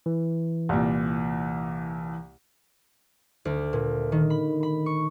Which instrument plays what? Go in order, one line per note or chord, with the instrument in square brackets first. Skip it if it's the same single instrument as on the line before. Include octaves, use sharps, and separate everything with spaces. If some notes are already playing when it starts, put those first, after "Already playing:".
[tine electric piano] E3
[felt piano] C2 A#2
[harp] D2
A#2
D#3
B5
B5
C#6